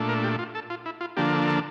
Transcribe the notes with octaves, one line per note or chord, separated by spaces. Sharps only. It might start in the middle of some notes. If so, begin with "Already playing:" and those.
Already playing: A#2 A3 D4
A#4
G4
F4
A4
F4
E4
F4
D3 F3 A#3 D4 G4
A4
A4